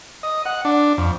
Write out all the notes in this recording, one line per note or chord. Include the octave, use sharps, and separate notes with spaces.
D#5
F#5
D4
F2